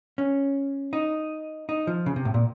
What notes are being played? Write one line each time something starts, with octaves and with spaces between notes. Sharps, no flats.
C#4
D#4
D#4
F3
C#3
C3
A2
A#2